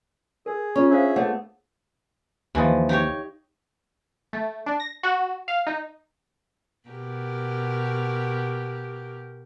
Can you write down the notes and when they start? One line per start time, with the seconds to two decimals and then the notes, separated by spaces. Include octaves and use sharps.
0.46 G#4 A#4
0.76 C#4 F4 C#6
0.90 D4 G#4 C5 E5 F5
1.16 A3 B3 G#4 C#5 F#5
2.55 D#2 E3 F3 D#5
2.89 D#4 G4 C#5
4.33 A3
4.66 D4
4.80 A#6
5.03 F#4
5.48 F5
5.67 D#4
6.89 B2 G4 A#4